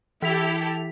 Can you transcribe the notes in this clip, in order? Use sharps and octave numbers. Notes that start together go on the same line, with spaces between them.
E3 E4 G4 A4 B6 F7